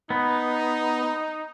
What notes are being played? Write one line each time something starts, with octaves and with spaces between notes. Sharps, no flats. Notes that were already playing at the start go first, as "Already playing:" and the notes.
B3 D#4